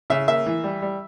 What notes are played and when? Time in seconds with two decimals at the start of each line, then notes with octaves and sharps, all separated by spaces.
0.10 C#3 E5
0.28 A#3 E5
0.46 E3
0.64 G3
0.82 G3